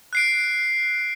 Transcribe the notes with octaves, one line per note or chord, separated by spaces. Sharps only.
F#6 C7 D7